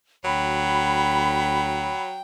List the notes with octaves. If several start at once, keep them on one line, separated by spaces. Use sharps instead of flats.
D2 F#3 G5 B5